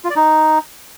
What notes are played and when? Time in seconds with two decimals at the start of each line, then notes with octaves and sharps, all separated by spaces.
0.04 F4
0.10 D5
0.16 D#4